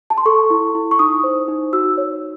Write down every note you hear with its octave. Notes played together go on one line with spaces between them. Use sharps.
A5
C6
A4 C#6
E4
E4
C#6
D#4 D#6
C5
D#4
F#4 E6
C#5